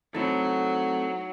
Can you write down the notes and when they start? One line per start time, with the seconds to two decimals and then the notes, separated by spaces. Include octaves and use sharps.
0.15 F#3 A3 C4 D#4 E4 A4